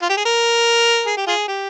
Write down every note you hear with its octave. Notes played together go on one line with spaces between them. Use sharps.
F4
G4
G#4
A#4
G#4
G4
F4 G#4
G4